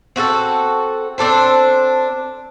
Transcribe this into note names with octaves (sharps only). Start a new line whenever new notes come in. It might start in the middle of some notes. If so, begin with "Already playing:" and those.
C4 F#4 G#4 A4
C4 D4 A4 C5